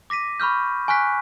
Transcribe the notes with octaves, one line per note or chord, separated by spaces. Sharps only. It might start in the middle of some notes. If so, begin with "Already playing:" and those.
D6 A#6 B6 D#7
B5 C#6 F6 G6
G#5 C#6 F6 F#6 B6